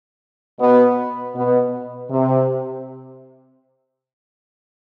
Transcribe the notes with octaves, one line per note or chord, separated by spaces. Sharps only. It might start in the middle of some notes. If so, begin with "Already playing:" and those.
B2 B3
B2 B3
C3